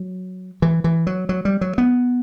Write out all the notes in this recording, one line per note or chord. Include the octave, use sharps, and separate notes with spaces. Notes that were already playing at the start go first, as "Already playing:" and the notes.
Already playing: F#3
E3
E3
F#3
F#3
G3
F#3
B3